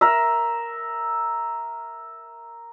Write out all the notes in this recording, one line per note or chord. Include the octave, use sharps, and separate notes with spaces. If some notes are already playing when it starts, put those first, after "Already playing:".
A#4 E5